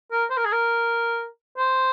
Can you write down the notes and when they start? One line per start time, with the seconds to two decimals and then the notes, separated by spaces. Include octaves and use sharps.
0.12 A#4
0.30 C5
0.37 A#4
0.45 G#4
0.52 A#4
1.58 C5